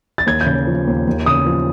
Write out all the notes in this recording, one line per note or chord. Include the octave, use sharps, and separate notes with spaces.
A6
D#2 G#6
G6
C#3
F3
D#2
D#2
C#3 D#6
F3